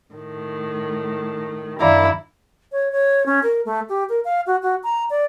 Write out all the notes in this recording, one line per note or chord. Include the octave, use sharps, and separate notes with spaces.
A2 D#3
F#2 D#3 D4 E4 D5 F5 A#5
C#5
C#5
C#4
A#4
A3
G4
A#4
F5
F#4
F#4
A#5
D5